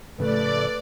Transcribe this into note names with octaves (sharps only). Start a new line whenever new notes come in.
A2 C#3 F3 A3 B4 D5